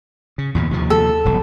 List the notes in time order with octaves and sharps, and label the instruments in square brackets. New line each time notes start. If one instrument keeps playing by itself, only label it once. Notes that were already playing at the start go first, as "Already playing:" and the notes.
[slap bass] C#3
E2 A#2 C#3
D#2 C3 F3
[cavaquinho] A4
[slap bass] D#1 B1 F#2